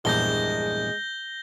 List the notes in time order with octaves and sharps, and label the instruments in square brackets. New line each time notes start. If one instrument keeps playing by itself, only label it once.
[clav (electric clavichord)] A#1 E2 G2 [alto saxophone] G#3 [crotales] G6 A#6 G7